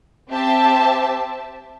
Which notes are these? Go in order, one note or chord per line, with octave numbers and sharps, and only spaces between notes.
C4 G4 C5 E5 A5